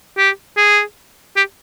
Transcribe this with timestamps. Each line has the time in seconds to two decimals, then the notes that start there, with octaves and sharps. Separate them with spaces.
0.17 G4
0.57 G#4
1.36 G4